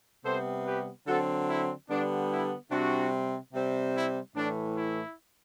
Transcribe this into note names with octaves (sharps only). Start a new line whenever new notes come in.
C3 G3 B3 A4 C5
G4 B4
D3 F#3 C4 F#4 A4
E4
D3 G3 B3 D4
E4
C3 G3 C4 D4 F#4
C3 G3 C4
E4
A2 E3 A3 D4
E4